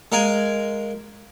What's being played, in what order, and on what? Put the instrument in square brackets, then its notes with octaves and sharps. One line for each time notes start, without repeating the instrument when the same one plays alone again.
[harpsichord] G#3 A#4 F5 G#5